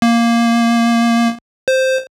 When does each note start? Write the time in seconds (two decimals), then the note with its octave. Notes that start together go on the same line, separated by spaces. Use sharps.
0.02 A#3
1.68 C5